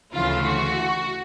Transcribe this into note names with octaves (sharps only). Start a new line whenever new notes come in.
D2 C#3 E3 A3 F4
F#4